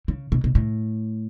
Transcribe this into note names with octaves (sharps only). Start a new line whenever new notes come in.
C#3
B2
B2
A2